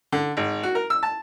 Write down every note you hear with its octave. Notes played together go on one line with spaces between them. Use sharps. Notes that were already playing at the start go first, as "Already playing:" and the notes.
D3
G#1
F#4
A#4
E6
A5